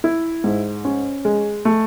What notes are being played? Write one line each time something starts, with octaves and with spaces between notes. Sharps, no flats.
E4
G#2
C#4
G#3
A3